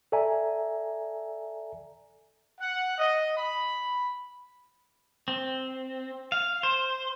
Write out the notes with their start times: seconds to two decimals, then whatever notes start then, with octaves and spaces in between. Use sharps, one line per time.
0.12 A4 D5 E5 G#5 A#5
2.58 F#5
2.96 D#5
3.35 B5
5.28 C4
6.32 F5
6.63 C5